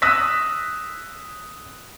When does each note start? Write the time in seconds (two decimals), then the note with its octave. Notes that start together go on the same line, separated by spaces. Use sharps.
0.02 D#6 E6 F#6 A#6 B6